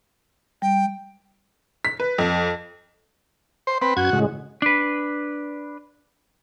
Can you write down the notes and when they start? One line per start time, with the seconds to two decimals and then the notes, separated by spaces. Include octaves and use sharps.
0.62 G3 G5
1.85 B6
2.00 B4
2.18 F2
3.67 C5
3.82 C4 B4
3.97 F#2 F#4 G#6
4.13 A2 C#3 G#3
4.62 D4 B4